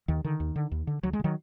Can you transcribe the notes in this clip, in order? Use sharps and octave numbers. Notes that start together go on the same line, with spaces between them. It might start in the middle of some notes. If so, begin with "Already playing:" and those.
D#2 D#3
D3 D#3
D#2
D3
D#2
D3
D2 F#3
G#3
D3
D#3 F#3